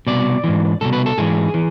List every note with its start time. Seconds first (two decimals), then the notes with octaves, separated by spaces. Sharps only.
0.07 C2 B2 D5
0.44 G#2 E3
0.81 C2 B2 A4
0.93 B4
1.06 A4
1.18 G#2 E3 G#4
1.54 E3